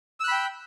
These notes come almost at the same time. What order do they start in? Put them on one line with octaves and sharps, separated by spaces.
E6 F#6 B5 G5